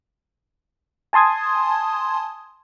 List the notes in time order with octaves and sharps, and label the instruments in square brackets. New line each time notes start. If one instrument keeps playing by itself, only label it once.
[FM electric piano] G#5 A5 C6 D#6 G#6